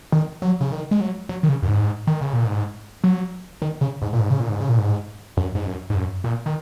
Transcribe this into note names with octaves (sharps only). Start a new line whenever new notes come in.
D#3
F#3
C#3
D#3
G#3
F#3
F#3
D#3
C#3
F#2
G#2
D#3
C#3
A#2
G#2
F#3
D#3
C#3
G#2
A#2
G#2
C#3
A#2
G#2
C#3
A#2
G#2
F#2
G#2
F#2
G#2
F#2
A#2
D#3